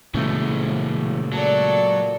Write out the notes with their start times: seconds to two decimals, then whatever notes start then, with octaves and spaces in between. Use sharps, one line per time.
0.14 C#2 A#2 C#3 E3 A3 E4 F#4
1.32 F#3 A4 D5